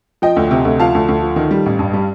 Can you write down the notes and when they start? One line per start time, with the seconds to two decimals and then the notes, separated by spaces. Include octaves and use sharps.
0.22 F3 D#5 G5
0.36 D2
0.51 C3
0.65 D2
0.80 F3 F5 A5
0.95 D2
1.08 D2
1.23 F3
1.36 D#3
1.51 G3
1.66 A1
1.79 G2
1.93 G3